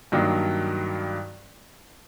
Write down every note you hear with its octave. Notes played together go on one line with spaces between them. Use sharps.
G2 D#3 F#3 A#3 D4